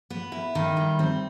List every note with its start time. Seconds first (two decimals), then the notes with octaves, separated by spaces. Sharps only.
0.10 B3
0.32 E4
0.55 D#3
0.77 G3
0.99 C4